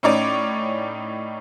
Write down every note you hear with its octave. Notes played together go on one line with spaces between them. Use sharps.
A2 C#4 D#4 C#5 D5 D6